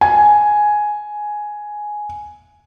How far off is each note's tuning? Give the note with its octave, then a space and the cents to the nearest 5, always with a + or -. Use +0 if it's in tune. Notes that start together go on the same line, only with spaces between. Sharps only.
G#5 +5